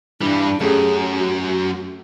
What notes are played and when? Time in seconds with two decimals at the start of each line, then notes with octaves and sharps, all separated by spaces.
0.21 G2 E3 G3 D4
0.61 F#2 A3 C#4 G4 G#4
1.17 F#4